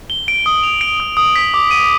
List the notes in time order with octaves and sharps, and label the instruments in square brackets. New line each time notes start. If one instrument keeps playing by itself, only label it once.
[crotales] G7
D7
D#6
F7
D7
D#6
D#6
B6
D6
D#7